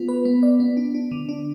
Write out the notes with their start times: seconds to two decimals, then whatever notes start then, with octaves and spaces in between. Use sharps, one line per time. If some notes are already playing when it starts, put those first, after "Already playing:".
Already playing: B3 F4
0.09 B4
0.25 B3
0.43 D5
0.60 B3
0.77 D4
0.95 D4
1.11 D3
1.29 D4